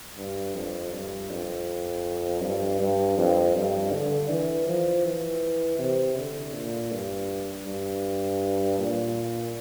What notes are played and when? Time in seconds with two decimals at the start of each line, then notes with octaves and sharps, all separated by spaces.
0.18 G2
0.55 F2
0.93 G2
1.30 F2
2.42 G2
2.79 G2
3.17 F2
3.55 G2
3.92 D3
4.30 E3
4.67 F3
5.05 E3
5.79 C3
6.17 D3
6.54 A#2
6.92 G2
7.66 G2
8.78 A#2